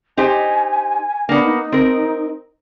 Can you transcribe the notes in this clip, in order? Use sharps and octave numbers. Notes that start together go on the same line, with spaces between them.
D#4 G4 C5 G#5
A#3 B3 D4
D#4
C4 A#4